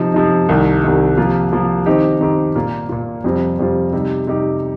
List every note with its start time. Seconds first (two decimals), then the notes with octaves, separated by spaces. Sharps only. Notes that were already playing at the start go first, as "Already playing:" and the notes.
Already playing: C3 F3 D#4
0.14 C3 F3 D#4
0.48 C2 C3 D#3
0.84 C2 C3 D#3
1.17 C3 F3 A#3 F4
1.52 C3 F3 A#3 F4
1.86 D#3 C4 D#4 G4
2.21 D#3 C4 D#4 G4
2.56 A#2 A#3 F4
2.89 A#2 A#3 F4
3.24 F2 C3 G3 C4 F4
3.59 F2 C3 G3 C4 F4
3.93 C3 G3 D#4 G4
4.27 C3 G3 D#4 G4